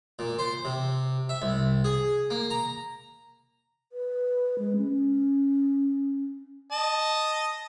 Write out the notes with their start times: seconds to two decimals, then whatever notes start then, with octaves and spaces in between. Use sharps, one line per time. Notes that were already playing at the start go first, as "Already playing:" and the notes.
0.19 A#2
0.39 C5
0.65 C3
1.29 E5
1.42 C2
1.84 G#4
2.30 A#3
2.50 A#5
3.92 B4
4.59 G#3
4.76 C#4
6.72 D#5 A5